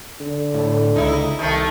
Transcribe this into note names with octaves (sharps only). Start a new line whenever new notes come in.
D3
A2
C#2 D#4 E4
C2 D#3 A3